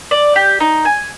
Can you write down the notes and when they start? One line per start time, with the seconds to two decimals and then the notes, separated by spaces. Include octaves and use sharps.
0.11 D5
0.36 G4
0.60 D#4
0.85 G#5